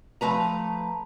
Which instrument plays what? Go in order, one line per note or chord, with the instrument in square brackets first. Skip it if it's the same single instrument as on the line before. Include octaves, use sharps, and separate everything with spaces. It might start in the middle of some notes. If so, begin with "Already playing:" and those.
[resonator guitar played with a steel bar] F3 A3 B4 A#5